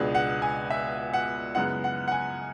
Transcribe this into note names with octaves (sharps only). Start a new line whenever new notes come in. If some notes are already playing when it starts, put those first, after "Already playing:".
Already playing: C#2 B2 G#3 B3 D4
F#5
G#5
E5
F#5
F#2 C#3 G#3 B3 E4 F#5
F#5
F#5
G#5